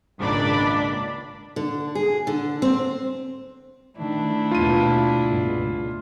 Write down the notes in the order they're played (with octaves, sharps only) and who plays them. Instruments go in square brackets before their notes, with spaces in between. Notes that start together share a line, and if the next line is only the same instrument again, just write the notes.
[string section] G#1 C#2 A#2 D4 D5 B5
[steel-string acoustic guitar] D3
G#4
D3
C4
[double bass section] D#3 [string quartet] A3 D4 E4
[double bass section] D#2 B2 [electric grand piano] F4 D#7
[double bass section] C#2 G2 B2